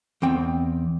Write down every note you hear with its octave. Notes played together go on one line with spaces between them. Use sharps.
E2 C4 G5